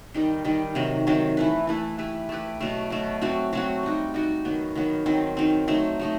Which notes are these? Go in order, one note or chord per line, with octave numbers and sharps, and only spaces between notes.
D#3 G3 D#4
D#3 G3 D#4
C3 D#3 F#3
C3 D#3 F#3
E3 A3 E4 B4
E3 A3 E4 B4
A3 E4 G4 B4
A3 E4 G4 B4
B2 F#3 A3
B2 F#3 A3
F#3 A3 C4 F#4
F#3 A3 C4 F#4
G3 D#4 F#4
G3 D#4 F#4
D#3 F#3 B3
D#3 F#3 B3
D#3 F#3 C4
D#3 F#3 C4
F#3 A3 D#4
F#3 A3 D#4